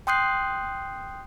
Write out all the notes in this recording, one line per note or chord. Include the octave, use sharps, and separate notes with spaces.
G5 C6 D#6 F#6 G6 C7